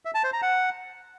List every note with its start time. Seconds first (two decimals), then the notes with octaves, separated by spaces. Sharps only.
0.05 E5
0.14 A5
0.24 C5
0.33 A#5
0.42 F#5